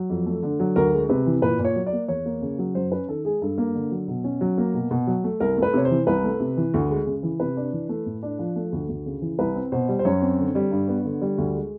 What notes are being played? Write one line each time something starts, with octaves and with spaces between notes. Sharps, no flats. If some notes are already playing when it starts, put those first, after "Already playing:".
Already playing: F#3
F2
A3
D3
F#3
D2 A#4
G#3
C3 B4
E3
A#2 B4
A#2
C#5
F#3
D5
A#3
E2 C#5
A#3
C#3
F#3
F#2 C5
C#4 B4
D#3 A4
G#3 G#4
G2 A4
A#3
D3
F#3
B2
C#4
F#3
A#3
B2
B2
F#3
A3
C2 A#4
A3
B4
C3 C#5
C5
E3
C2 B4
A3
C3
E3
D2
G#3
C#3
E3
C3 B4
D4
E3
A3
A2
D4
F3
A3
D2
D2
C#3
E3
C2 B4
C4
B2 C5
G3
C5
F#2 C#5
C4
D3
G3
G2
B3
D3
G3
D2
G#3